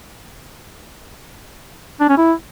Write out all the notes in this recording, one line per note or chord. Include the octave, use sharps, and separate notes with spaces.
D4
C#4
E4